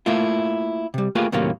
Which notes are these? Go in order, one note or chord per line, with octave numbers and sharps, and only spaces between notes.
A3 A#3 E4 F4
C3 G3
A3 A#3 F4 G4 G#4 B4
D#2 A2 C3 F#3 A3 A#3